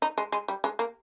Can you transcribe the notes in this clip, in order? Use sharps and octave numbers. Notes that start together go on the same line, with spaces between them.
D#4
G#3
G#3
G3
G#3
A#3